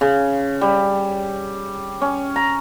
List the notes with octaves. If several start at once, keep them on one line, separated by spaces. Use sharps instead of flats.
C#3
G3
C#4
A#5